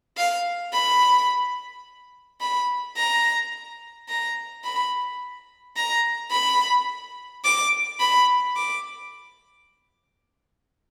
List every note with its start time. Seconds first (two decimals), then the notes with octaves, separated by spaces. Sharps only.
0.17 F5
0.73 B5
2.41 B5
2.97 A#5
4.09 A#5
4.64 B5
5.77 A#5
6.32 B5
7.44 D6
8.00 B5
8.56 D6